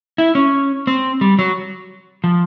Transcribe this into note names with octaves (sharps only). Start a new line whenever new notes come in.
E4
C#4
C4
G3
F#3
F3